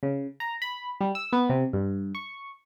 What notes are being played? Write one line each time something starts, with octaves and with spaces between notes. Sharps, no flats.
C#3
A#5
B5
G3
E6
B3
C3
G2
C#6